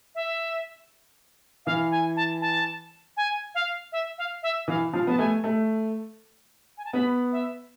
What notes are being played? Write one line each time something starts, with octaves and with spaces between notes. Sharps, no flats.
E5
E3 F5
G#5
A5
A5
G#5
F5
E5
F5
E5
E3 F5
F3 F5
B3 A5
A3 G#5
A3
G#5
A5
B3 B5
E5